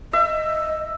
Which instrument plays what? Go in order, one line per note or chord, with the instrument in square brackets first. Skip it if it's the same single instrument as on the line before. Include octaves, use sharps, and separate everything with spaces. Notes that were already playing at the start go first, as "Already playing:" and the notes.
[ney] D#5 [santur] E5